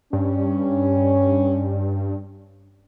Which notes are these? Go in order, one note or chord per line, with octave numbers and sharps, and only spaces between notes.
G2 G3 C#4